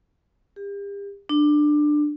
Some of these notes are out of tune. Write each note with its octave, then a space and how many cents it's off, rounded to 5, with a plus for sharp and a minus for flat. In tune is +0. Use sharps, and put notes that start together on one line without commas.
G4 +40
D4 +15